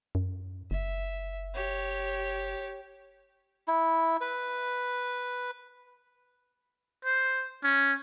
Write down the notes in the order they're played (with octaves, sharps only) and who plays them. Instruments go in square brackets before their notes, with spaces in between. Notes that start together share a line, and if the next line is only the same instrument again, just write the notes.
[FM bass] F#2
[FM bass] F#1 [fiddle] E5
[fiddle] G4 C#5
[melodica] E4
B4
[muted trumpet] C5
C#4